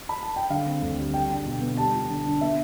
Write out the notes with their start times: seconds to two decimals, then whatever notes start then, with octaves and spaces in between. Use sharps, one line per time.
0.09 B5
0.23 A5
0.36 G5
0.50 D3 F5
0.66 C4
0.82 D2
0.98 G3
1.14 G3 G5
1.30 D4
1.45 B2
1.61 B3
1.77 G3 A5
1.94 F4
2.10 D3
2.26 D4
2.41 B3 E5